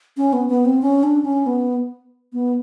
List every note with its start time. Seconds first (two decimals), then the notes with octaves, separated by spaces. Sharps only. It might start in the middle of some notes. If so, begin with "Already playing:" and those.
0.17 C#4
0.33 B3
0.48 B3
0.65 C4
0.82 C#4
1.03 D4
1.25 C#4
1.46 B3
2.33 B3